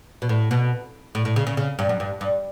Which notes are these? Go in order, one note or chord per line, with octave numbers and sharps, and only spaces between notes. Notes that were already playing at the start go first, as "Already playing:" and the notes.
B2
A2
B2
A2
A2
C#3
C#3
C#3
G2
F#2
G2
G2